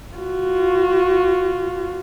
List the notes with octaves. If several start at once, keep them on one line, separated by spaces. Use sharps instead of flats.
F4 F#4